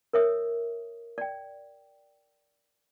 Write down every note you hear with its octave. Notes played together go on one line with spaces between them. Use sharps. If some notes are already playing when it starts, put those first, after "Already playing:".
A#4 C#5 E5 D#6
D5 G5